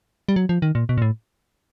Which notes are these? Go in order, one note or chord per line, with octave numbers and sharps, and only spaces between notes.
G3
F#3
F3
D#3
A#2
B2
A#2
A2